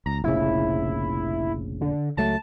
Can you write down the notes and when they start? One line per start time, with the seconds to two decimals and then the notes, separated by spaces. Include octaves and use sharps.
0.06 C#2 A#5
0.24 F1 A#1 C#3 E4
1.81 D3
2.17 C#2 F#3 A3 A5